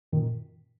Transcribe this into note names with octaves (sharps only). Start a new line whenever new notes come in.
F#2 A#2 D#3